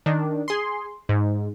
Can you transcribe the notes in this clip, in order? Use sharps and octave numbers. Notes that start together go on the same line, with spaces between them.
D#3 D4
G#4 C6
G#2